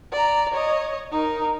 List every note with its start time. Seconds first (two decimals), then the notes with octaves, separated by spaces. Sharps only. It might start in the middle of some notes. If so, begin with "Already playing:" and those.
0.12 D5 A#5
0.54 C#5 D#5
1.12 D#4 A#4